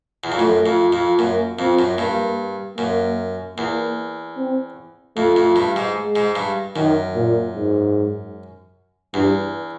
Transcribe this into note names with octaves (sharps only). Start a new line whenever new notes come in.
E2
F2
F#2 A3
F2
F2
F#2 A#3
F2 C4
F#2
G2 A#3
F#2 A#3
E2 A#3
C4
F2 A3
F2
G2
G#2
G#3
G#2
G2
F#2 D#3
A#2
G#2
E2 G2